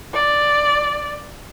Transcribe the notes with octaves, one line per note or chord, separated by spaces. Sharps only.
D5